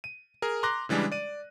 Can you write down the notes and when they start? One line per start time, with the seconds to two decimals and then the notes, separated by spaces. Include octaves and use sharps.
0.04 D#7
0.42 G#4 A#4
0.63 A#5 C6 D6 F#6 A#6
0.89 C#3 E3 G3 G#3 D4
1.12 D5 D#7